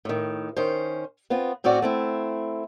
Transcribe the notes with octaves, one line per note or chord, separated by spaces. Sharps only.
A2 D#3
D#3 C#4 C5
B3 C4 F4
A2 C4 C#4 F#4 D5
A3 C4 E4